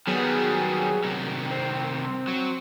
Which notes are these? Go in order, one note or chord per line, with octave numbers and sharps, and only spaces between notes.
D#3 F#3 G3 B3 G#4
C2 D#3
C4
F#3